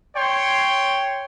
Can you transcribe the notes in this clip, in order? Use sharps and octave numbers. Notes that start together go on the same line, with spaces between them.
C#5 G5 C6